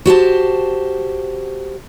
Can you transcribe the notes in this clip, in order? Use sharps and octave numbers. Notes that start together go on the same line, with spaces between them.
F#4 G4 C5 A5